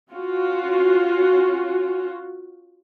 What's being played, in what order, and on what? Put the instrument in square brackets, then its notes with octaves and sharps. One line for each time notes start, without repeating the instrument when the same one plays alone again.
[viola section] C#4 F4 F#4